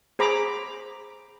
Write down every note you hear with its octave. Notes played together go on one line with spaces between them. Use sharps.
G#4 C5 A#5 B5 D6